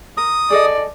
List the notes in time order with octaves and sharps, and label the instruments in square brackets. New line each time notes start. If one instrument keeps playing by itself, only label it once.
[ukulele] A#4 [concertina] D#6
[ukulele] G#4 A4 D#5 [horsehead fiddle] D5